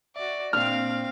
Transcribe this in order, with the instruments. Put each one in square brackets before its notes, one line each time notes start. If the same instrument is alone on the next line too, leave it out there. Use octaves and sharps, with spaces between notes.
[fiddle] F#4 D5 [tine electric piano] E5
[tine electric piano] A#2 A#3 D4 [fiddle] C4 F5 [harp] F6